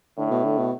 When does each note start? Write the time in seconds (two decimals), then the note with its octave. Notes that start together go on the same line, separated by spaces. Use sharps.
0.18 A2 D3
0.31 B2
0.44 D3
0.58 B2